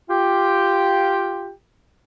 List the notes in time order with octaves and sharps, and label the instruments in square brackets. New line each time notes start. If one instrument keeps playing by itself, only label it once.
[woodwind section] F4 G4 G5